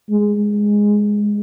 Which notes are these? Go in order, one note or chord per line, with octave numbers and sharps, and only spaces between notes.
G#3